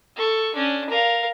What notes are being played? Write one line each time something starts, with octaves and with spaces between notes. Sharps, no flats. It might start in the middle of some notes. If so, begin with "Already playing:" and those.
A4 C#6
C#4 D4
A#4 F5